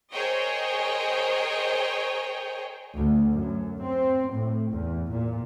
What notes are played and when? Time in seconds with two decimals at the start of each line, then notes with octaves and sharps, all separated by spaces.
0.11 G#4 A#4 C5 C#5 D#5 G5
2.96 D2
3.33 F#2
3.84 C4
4.34 A2
4.72 E2
5.11 A#2